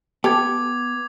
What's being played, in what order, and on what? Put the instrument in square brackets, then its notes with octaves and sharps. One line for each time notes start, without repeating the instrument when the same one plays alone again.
[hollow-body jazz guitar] B3 [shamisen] G4 A4 [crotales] D6 G#6